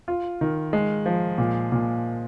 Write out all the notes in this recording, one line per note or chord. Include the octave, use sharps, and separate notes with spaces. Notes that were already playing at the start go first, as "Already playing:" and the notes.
F4
D#3
G#3
F3
A#2
A#2